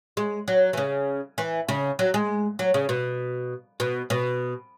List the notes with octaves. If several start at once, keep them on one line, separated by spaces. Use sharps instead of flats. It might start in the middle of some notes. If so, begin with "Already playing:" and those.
G#3
F#3
E3
C#3
E3
C#3
F#3
G#3
F#3
C#3
B2
B2
B2